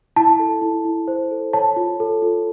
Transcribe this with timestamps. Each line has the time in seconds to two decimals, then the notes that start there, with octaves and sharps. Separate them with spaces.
0.16 E4 A5
0.39 A4
0.62 E4
0.85 E4
1.08 C5
1.31 A4
1.53 C#5 A5
1.76 F4
2.00 A4
2.22 F4